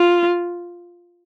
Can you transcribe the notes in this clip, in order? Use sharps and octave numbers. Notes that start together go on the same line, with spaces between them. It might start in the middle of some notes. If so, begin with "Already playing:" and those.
Already playing: F4